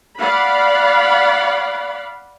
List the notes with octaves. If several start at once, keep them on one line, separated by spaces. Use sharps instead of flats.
D5 F5 F#5 B5